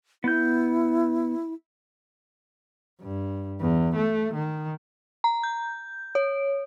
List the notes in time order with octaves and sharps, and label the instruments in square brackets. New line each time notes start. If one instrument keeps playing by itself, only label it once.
[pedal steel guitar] B3 G6 [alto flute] E4
[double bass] G2
E2
A3
D#3
[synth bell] A#5
G6
C#5